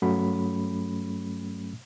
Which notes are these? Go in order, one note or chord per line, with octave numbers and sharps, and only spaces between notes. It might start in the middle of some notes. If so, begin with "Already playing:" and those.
G2 F#3 A3 C#4 B5